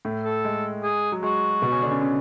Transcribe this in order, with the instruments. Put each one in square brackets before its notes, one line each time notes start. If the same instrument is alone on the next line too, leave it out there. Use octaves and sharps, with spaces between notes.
[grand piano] A2 A3
[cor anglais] A4
[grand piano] G#3
[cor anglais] G#4
[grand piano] F#3
[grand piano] G#3 [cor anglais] F#4
[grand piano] B2 B3
C#3 C#4
D3 D4
C#3 C#4
C#3 C#4